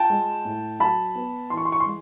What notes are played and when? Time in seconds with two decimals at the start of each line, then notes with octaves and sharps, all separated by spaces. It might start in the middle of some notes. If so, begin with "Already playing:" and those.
Already playing: F4 G5 A5
0.10 G#3
0.45 A2
0.80 F#3 A5 B5
1.15 B3
1.50 E3 C6
1.57 C#6
1.65 C6
1.72 C#6
1.80 C6
1.86 G#3